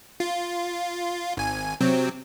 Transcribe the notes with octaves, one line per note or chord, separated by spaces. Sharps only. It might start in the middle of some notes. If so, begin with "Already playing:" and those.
F4
G#1 G#5
C3 F#3 C4